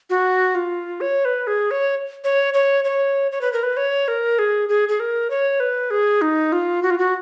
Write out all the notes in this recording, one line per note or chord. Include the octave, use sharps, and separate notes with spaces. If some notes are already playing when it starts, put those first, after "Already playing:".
F#4
F4
C#5
B4
G#4
C#5
C#5
C#5
C#5
C#5
B4
A#4
B4
C#5
A#4
G#4
G#4
G#4
A#4
C#5
B4
G#4
D#4
F4
F#4
F4
F#4